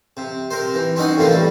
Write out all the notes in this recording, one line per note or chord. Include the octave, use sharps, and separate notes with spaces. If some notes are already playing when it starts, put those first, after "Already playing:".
C3
C3 A#4 C5
E3
C4 C#4 D#4 F#5 G#5
F2 A2 C3 E3 A3 A#3
G3